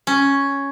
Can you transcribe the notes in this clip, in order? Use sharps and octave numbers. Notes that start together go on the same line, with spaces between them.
C#4